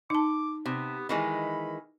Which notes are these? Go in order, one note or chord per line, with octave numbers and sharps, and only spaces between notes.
D#4 A5 D6
C3 B3
D#3 E3 G#3 B5